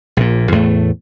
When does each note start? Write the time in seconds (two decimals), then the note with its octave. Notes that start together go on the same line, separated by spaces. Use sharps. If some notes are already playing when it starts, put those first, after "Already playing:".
0.17 A#1 A#2
0.52 E2 A2 A3